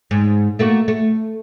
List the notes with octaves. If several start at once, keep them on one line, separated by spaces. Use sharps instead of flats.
G#2
A3 A#3 F#4
A3